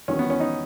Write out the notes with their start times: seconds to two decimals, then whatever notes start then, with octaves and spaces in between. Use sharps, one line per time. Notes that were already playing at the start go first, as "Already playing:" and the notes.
0.08 E2 D#3 F#3 C#4
0.19 B3
0.30 C#4
0.40 D#4